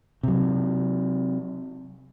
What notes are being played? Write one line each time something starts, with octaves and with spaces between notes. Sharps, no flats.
C3 F#3